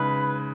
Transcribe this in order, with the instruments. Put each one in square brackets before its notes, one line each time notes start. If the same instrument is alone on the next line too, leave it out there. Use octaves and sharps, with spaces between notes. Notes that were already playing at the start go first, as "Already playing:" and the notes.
Already playing: [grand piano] C#3 G#3 D#4 [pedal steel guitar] B4